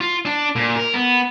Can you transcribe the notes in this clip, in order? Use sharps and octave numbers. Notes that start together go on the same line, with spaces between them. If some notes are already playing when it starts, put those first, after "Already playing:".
F4
D4
A#2
A#4
B3